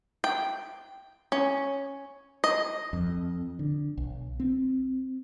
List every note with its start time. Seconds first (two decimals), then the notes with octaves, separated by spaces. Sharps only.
0.24 G5
1.32 C#4
2.44 D#5
2.93 F2
3.59 D3
3.97 B1
4.40 C4